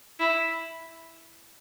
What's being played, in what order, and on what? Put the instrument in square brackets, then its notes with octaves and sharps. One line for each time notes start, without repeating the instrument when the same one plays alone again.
[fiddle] E4